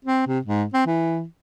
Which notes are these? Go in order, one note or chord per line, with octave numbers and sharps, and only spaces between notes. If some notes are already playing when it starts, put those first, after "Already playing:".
C4
C3
G#2
C4
E3